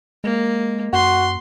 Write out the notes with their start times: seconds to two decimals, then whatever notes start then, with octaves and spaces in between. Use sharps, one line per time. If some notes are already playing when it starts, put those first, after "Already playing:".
0.24 G#3 A#3
0.93 F#2 F#4 C6